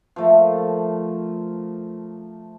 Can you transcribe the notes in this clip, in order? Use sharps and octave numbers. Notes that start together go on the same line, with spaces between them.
F3 A3 A#4